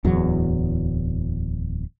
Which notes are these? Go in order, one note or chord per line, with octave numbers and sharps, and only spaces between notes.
D1 E2 F#3